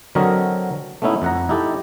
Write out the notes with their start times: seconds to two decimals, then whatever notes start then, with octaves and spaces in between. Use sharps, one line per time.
0.15 D3 F#3 C4 A#4 C#5 D#5
1.02 A3 B3 C#4 D#4 E4
1.22 F2 F#5 A#5
1.49 D#4 E4 G4 A4